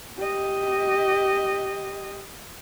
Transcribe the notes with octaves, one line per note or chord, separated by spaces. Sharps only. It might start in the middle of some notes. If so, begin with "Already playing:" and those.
G4 D#5